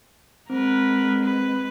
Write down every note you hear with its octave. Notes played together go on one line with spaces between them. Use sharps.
G#3 C4 A#4 B4
B4